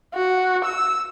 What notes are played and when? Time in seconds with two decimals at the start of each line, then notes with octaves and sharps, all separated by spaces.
0.14 F#4
0.65 E6